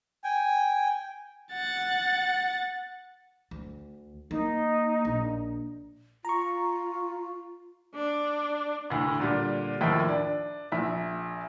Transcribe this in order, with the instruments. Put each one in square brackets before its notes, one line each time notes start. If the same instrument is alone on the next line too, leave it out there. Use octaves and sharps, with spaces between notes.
[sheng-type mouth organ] G5 G#5
[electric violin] F#5 A6
[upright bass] D2
[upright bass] A#3 [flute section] D#4
[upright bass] A#1
[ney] F4 [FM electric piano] A#5 C#6
[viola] D4
[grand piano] D2 A2
A#2 D3 G3
D#2 A2 F3 E5 G5
D4
A#1 E5